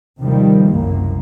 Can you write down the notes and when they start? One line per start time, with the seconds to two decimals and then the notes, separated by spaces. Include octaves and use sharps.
0.19 D#2 C3 D#3 F3 G3
0.64 F#1 C2 F#2 A#3